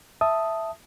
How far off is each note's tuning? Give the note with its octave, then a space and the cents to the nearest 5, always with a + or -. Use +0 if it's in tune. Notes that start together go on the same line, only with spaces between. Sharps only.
E5 +0 A5 +0 D#6 +0